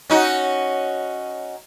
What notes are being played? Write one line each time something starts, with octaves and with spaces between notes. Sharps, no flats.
C#4 D#4 F#4